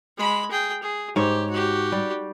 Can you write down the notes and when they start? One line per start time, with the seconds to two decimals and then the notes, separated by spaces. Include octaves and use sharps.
0.18 G#3 B5
0.51 G#4 G5
0.82 G#4
1.16 G#2 G4 C#5
1.50 F#4 G4
1.92 G3